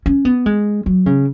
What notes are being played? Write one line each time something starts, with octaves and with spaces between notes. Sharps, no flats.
C#4
B3
G#3
F#3
C#3